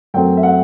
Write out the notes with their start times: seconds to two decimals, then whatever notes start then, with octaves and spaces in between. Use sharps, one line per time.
0.14 F#2 F#3 A3 C4 G5
0.37 E5
0.43 F#5